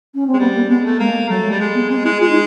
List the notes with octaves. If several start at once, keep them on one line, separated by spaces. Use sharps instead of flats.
C#4
C4
G#3
G3 B3
A#3
G#3 B3
A3
G#3 A#3
F#3 A3
G#3
G3
G#3
B3
G#3 C4
G#3 E4
G#3 F4
D#4